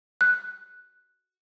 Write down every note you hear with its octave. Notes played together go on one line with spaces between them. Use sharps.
F#6